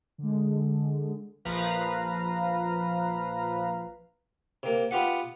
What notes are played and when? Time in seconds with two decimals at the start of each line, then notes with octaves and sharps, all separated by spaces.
0.18 D3 G#3
1.45 A#1 F3 B4 F5 A#5
4.63 C3 A#3
4.91 B3 F4 G4 F#5